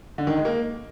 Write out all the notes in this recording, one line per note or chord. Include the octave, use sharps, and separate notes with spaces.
D3
D#3
G#3
A#3